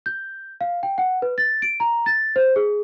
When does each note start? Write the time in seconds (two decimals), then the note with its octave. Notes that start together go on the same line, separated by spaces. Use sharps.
0.06 G6
0.61 F5
0.83 G5
0.98 F#5
1.22 B4
1.38 A6
1.62 D7
1.80 A#5
2.06 A6
2.36 C5
2.56 G#4